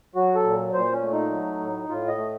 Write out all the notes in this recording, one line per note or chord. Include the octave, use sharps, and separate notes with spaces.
F#3 F#4
A4
A#2
A#2 C5
C#4
A3
D#4
F#3
A2
A2 F4
D#5
A3